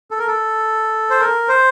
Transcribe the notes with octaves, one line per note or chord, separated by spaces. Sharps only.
A4
A#4
A4
C5
A#4
C5